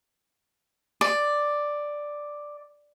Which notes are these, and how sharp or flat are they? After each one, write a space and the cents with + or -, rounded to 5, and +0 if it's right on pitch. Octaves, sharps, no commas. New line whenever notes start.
D5 +5